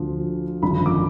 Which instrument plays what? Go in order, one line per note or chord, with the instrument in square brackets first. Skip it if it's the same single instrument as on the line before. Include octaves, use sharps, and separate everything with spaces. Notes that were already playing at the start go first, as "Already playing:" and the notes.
Already playing: [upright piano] D2 D3 F3
G#1 F#2 D3 F3 B5
D6